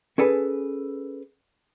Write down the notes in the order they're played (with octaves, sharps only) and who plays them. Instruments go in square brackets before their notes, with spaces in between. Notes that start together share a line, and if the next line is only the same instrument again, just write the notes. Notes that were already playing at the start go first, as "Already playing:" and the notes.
[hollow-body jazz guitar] C#4 G#4 A4 B4